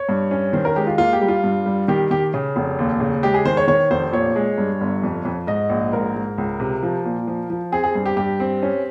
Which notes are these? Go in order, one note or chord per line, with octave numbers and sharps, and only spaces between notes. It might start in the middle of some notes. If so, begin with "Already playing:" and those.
Already playing: C#5
G2
C#4
D#3 C5
A#4
G#3 G4
F4
A#3 F4
G4
G3
F4
G2
G3
D#3 G4
D#3 G4
C#3
F1
D#2
C#3
G#3 G4
G#4
D#3 C5
C#5
D#3 C#5
F1 C5
A#2 C#5
G#3
G2
G1
F2
F2
G#2 D#5
A#1
G#2 A#4
G#2
C#2
C3
F3
A#2
F3
F3
C4 G#4
G#4
G2
G4
G2 G4
C4
C#4